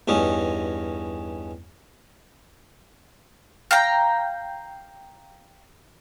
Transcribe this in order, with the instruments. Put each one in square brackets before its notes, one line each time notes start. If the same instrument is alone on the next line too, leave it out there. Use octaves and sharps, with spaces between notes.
[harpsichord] E2 G2 C#4 D#4
[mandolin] F5 G5 A#5